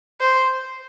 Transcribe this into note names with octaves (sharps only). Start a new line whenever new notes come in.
C5